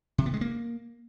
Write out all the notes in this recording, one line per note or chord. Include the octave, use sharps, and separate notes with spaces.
C3
B3
G#3
A#3